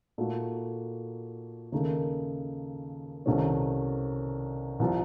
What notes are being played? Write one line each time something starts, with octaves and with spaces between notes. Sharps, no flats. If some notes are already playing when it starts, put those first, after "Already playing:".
A#2 A3 D#4 F#4 A4
D#2 C#3 A3 D#4 A#4
C2 C3 D#3 A3 C#4
C2 C3 F3